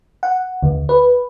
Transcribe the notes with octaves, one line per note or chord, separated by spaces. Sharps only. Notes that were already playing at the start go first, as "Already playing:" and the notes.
F#5
D2
B4